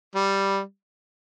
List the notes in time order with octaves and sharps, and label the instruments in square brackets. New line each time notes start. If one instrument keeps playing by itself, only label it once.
[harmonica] G3